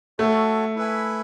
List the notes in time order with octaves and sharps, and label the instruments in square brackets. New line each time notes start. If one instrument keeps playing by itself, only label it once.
[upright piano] A3 [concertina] F#4 A4 C#5
[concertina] E4 B4 E5 G#5